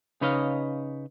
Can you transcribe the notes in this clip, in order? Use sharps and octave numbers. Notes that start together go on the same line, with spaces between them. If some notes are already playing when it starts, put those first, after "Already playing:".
C#3 D#4 B4 C#5 D#5 F5